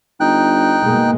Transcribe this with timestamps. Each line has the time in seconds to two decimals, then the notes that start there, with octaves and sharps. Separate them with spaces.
0.20 G1 D#4 G5 F#6
0.83 B2 G#3 A#3